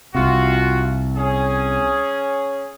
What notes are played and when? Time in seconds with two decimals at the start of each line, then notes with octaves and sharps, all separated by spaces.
0.15 C2 C3 F4 F#4
1.17 C#4 G#4